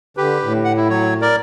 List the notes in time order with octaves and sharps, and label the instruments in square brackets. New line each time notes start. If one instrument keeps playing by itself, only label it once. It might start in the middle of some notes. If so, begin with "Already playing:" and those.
[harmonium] D3 [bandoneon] G4 B4
[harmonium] A2
[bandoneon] F#5
E4
F#3 C#5
A#4 D5